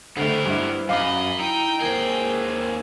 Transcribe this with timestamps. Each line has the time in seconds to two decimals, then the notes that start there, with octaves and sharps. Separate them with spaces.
0.17 D3 A3 B3 G4 A#4 C5
0.46 G2 E4
0.89 F#2 D#5 F5 B5 D6
1.40 D#4 E4 G5
1.80 D#2 G#4 A#4 C5